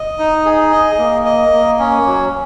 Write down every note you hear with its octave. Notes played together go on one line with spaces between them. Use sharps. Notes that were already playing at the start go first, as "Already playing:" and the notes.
Already playing: D#5
D#4
G#4
D#5
A#3
D#5
A#3
C#4
F#3